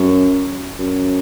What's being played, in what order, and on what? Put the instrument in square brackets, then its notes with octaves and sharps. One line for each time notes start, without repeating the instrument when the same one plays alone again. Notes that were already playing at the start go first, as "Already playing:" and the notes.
Already playing: [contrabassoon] F#2
F#2